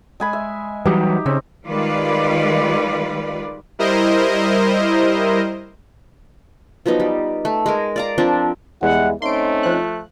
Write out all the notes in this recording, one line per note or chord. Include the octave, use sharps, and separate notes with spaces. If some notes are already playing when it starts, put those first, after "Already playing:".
G#3 G#5 B5
E5
E3 F#3 G3 D#4 G4
C#3 C4
D#3 G3 G#3 F4 B4 D5
G3 E4 A#4 C5 D#5
F3 F#3 B3 D#4
G3
A3
G#3 A#4
D5 F5 A#5
F3 C4 D4
E2 G3 G#3 E4 F#5
A3 C4 C#4 D#4 C6 D7
F3 F#6